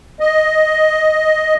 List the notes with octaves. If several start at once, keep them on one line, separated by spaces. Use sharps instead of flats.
D#5